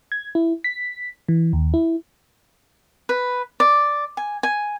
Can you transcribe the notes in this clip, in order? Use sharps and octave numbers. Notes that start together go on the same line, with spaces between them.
G#6
E4
B6
E3
D#2
E4
B4
D5
G#5
G#5